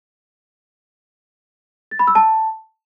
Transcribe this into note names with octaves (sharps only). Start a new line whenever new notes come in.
A6
B5
E6
A5